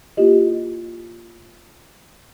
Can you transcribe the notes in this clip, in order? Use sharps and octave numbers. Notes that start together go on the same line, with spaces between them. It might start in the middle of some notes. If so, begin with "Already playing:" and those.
A#3 E4 F4 G4 D#5